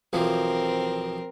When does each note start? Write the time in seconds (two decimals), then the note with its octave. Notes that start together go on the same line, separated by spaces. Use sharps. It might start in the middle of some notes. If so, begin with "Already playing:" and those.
0.13 B1 E3 F3 C4 A#4